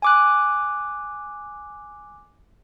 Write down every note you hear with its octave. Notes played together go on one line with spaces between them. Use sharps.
G#5 D6 F#6